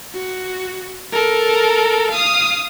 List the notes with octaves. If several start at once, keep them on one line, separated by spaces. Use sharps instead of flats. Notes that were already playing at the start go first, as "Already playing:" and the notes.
F#4
A4 A#4
F5 D#6